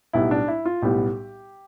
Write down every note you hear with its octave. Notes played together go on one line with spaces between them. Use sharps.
B1 A2 G3 B3 E4
D4
E4
F4
B1 A2 G3 B3 G4